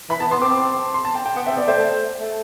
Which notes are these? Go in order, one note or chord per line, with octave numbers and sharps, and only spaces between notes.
E3 B5
B3 A5
B3 C6
C4 D6
C6
A5
G5
G5
B3 F#5
C4 E5
B3 D5
A3 C5
A3
A3